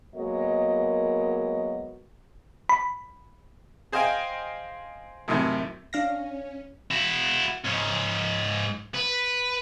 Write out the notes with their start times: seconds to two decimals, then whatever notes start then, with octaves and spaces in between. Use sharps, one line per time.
0.16 F#3 G#3 A#3 B3 A#4 D#5
2.69 B5
3.92 G#4 C5 D#5 F5 G5 G#5
5.28 F#2 A2 C3 D#3 A3
5.93 C#4 D4 F5 A#6
6.91 E4 F#4
7.65 G#2 C#4
8.95 B4